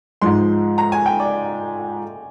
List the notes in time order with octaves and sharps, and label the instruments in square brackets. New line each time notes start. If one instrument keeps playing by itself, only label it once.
[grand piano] G#2 F3 G#3 [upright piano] C6
[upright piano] A#5
G#5
G5
D5